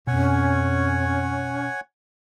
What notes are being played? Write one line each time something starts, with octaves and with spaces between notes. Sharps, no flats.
F2 B2 C#4 C#5 F#5 G#5